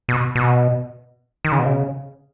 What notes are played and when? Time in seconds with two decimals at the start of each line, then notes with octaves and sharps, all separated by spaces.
0.09 B2
0.35 B2
1.45 D#3
1.52 C#3
1.59 B2
1.66 C#3